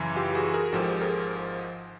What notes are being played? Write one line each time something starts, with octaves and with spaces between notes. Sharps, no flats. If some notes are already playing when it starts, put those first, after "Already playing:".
Already playing: F#2 C#3 E3
F4 G4
F#4 G#4
G#4 A#4
G#1 G#2 F3 G4 A4
G#4 A#4